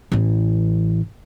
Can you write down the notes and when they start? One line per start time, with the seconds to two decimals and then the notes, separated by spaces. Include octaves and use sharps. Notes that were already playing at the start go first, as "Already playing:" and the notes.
0.12 A1 E3